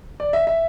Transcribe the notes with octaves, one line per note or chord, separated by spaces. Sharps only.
D5
E5
E5